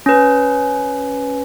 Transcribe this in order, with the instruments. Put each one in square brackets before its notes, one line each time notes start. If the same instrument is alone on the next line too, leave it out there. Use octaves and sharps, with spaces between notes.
[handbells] C#4 B4